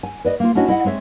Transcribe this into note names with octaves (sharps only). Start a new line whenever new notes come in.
G#5
B4 D5 D#5
A#3 F4
C#4 D4 E4 F#4 C#5 D#5
E4 D#5 F#5
G#3 C4 C#5 E5